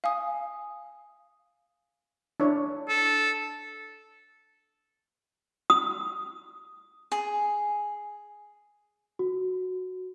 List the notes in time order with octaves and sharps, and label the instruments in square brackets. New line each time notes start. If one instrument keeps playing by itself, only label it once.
[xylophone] F5 G#5 D#6
[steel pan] D4 E4 C#5
[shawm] A4
[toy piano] D#6
[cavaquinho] G#4
[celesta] F#4